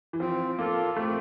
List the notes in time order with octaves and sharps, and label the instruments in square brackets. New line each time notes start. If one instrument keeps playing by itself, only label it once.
[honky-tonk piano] E3
[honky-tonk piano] F3 [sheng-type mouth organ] C4
[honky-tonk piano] A#3 [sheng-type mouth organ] F4 A4
[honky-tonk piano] A3 [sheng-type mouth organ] C4